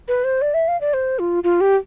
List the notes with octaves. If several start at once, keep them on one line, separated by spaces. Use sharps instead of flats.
B4
C5
D5
E5
F5
D5
C5
F4
F4
G4